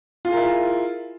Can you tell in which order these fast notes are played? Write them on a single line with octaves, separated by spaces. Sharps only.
F4 G#4 A#4 E4